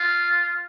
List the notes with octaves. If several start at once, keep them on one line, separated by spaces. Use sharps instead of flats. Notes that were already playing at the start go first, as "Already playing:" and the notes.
Already playing: F4